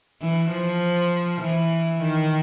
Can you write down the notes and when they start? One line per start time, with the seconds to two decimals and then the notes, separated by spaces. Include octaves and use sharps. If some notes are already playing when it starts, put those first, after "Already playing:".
0.22 E3
0.52 F3
1.42 E3
2.02 D#3